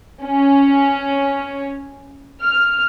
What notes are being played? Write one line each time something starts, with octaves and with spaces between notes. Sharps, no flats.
C#4
F6